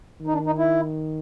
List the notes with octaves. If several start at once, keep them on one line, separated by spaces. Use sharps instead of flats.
D#3
D#4
D4
D#4
E4